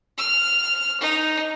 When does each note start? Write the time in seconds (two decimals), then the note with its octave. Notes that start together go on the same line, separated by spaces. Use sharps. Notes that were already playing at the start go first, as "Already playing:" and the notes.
0.18 F6
1.01 D#4